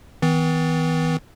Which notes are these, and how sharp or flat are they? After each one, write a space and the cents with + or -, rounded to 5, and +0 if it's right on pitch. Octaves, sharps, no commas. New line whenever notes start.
E3 -40 B3 +40